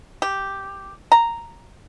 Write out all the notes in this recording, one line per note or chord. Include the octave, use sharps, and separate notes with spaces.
G4
A#5